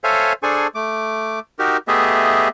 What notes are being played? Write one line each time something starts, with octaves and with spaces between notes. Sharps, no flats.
A4 C5 C#5 E5 F5 G#5
D4 G#4 A4 C5 G#5 C#6
A3 D6
D#4 F#4 G4 A#4
A3 B3 G4 G#4 D#5 E5